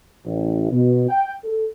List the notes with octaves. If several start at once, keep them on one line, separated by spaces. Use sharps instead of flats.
A1
B2
G5
A4